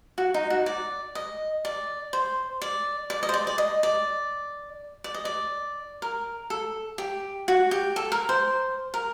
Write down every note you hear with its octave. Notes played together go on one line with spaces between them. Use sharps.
F#4
D#4
F#4
D5
D#5
D5
C5
D5
D5
D#5
C5
D5
D5
D#5
D5
D5
D#5
D5
A#4
A4
G4
F#4
G4
A4
A#4
C5
A#4